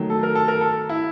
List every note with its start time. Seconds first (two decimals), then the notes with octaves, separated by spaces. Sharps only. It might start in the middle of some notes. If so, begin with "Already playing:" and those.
Already playing: D#3 F#3 A3
0.10 A4
0.23 A#4
0.35 A4
0.48 A#4
0.61 A4
0.89 E4